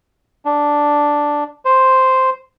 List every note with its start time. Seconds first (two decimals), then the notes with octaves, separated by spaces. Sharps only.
0.45 D4
1.65 C5